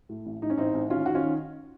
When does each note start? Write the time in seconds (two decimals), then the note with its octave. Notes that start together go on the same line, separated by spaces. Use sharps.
0.09 A2
0.26 A1
0.42 A2 D#4
0.50 C#4
0.57 A1 C4 D#4
0.74 A1
0.90 D#3 C#4 F4
1.06 D#3 F#4
1.15 C#4 F4
1.22 D#3